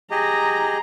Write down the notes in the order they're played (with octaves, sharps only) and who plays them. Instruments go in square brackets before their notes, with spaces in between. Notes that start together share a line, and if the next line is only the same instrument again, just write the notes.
[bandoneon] G4 G#4 D#5 [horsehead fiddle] A#5